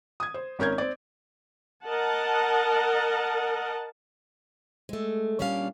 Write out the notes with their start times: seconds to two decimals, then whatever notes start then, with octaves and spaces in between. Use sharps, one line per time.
0.20 D#6 G#6
0.34 C5
0.59 G#1 C#4 A#4 G6 G#6
0.78 C4 D5
1.86 A#4 D#5 F#5 A5
4.89 G#3 A3
5.39 A#2 G3 C#4 D4 F5